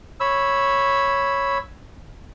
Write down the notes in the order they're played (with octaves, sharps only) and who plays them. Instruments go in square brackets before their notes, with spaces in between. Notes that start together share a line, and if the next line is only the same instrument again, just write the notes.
[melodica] C#5 B5 E6